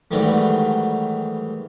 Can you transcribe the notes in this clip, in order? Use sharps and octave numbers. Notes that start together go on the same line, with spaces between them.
G#2 D#3 E3 F#3 G3 A3